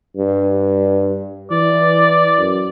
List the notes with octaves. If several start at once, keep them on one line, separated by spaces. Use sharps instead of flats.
G2
E3 D5
F#2